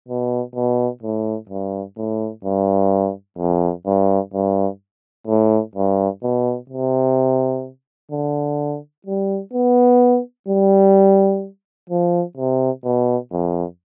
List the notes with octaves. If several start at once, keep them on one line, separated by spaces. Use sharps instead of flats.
B2
B2
A2
G2
A2
G2
F2
G2
G2
A2
G2
B2
C3
D3
G3
B3
G3
F3
C3
B2
F2